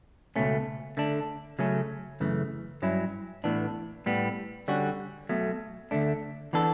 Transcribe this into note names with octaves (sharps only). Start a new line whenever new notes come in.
C#2 B2 A3 C#4
D3 A3 D4
C#3 F#3 A3 C#4
F#2 C#3 E3 A3
G2 F#3 C#4 E4
A2 E3 B3 D4
A2 G3 B3
D3 G3 C#4 F#4
B1 B2 F#3 A3
D2 D3 A3 D4
E3 B3 D4 A4